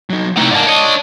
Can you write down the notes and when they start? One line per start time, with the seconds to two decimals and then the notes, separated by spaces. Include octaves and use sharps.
0.10 F#3 D#4
0.37 C3 D#3 E3 A3
0.51 G#2 A#3 D5 A5
0.67 C#5 D#5